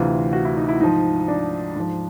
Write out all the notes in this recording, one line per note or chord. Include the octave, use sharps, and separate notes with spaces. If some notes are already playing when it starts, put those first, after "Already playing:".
Already playing: D2 C3 E3 F4
F#4
E4
D#4
E4
G#2 F3 D#4
D4
G#2 F3